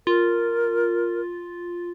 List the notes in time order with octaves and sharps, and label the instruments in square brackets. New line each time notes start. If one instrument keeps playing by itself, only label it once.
[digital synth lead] F4 [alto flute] A#4